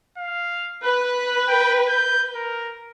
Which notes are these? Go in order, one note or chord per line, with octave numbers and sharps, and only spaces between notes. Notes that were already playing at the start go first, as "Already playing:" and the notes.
F5
B4 F#6
G5
G6
A#4